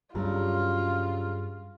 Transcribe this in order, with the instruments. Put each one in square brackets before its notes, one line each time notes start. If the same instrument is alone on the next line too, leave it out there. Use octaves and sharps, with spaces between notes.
[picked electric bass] G2 [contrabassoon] C#3 [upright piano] F#3 G3 [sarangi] F4